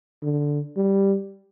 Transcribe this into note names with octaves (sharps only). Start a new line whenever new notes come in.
D3
G3